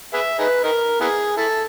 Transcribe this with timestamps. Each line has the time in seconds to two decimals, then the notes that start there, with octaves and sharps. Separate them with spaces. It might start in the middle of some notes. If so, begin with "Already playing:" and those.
0.14 G#4 B4 E5
0.39 D#4 G#4 B4
0.64 D#4 A#4
1.01 B3 E4 G#4
1.37 E4 A4